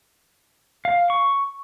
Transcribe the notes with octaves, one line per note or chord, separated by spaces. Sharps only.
F5
C#6